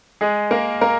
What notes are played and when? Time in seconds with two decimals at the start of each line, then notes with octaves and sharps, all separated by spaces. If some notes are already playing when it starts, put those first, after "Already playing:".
0.21 G#3 G#4
0.51 A#3 A#4
0.81 A#3 A#4